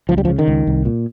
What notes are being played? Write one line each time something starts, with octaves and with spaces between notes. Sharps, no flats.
C#2 F3
G3
F3
C#3
D#3
C#2
C2
A#2